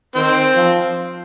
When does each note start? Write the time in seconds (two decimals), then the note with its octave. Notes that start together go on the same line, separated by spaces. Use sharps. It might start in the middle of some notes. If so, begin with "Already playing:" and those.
0.16 D#3 C4
0.56 F3